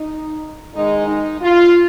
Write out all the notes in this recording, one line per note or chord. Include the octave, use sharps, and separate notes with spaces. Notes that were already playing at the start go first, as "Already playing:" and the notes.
Already playing: D#4
G#2 D#3 G#3 D#4
D#4
F4